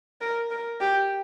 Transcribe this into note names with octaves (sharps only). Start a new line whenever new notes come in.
A#4
A#4
G4